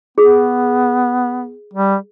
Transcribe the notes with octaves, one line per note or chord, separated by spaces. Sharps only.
B3 G#4
G3